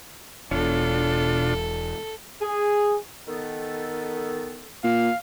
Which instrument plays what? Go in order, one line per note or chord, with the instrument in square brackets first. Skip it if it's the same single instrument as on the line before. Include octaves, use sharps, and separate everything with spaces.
[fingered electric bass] E1 [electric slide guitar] B2 C#5 [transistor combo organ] D4 F4 [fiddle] A4
[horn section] G#4
[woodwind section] D#3 B3 A4
[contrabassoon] A#2 [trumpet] F5